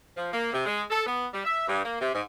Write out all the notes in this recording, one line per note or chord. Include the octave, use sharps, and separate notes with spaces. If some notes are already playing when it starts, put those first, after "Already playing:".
F3
A#3
C3
G#3
A4
B3
G3
E5
G2
A#3
C3
G#2